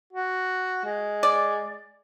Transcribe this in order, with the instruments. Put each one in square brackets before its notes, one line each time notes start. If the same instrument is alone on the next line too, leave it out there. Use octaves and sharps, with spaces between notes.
[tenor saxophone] F#4
G#3
[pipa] D5